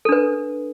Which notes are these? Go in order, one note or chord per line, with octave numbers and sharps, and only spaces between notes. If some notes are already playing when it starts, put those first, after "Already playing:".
D4 A4 B4